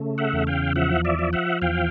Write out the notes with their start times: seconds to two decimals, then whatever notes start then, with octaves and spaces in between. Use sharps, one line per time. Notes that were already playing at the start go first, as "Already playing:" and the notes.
Already playing: C#3 A3
0.18 E5 F#5
0.33 E2
0.47 F5 G5
0.76 F3 E5 F#5
1.05 D5 E5
1.19 F3
1.33 E5 F#5
1.62 E2 F5 G5